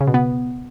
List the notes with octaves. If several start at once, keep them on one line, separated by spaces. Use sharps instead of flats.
C#3
B2
B3